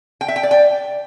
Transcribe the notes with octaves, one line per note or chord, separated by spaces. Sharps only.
G5
E5
G5
D5
G5